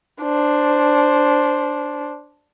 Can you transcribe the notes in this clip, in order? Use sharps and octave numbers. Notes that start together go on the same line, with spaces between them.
D4 C5